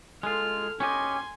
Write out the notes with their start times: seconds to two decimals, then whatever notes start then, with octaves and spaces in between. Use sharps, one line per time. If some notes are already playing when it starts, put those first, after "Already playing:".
0.23 G#3 F4 A4 F6
0.80 C#4 G4 D#5 G#5 C6